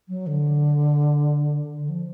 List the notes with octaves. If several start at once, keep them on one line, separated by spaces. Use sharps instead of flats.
F#3
D3
D3
F3